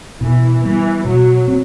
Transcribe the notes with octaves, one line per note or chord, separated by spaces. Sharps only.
B2 E3
E3 G3 B3
B2 F#3
C4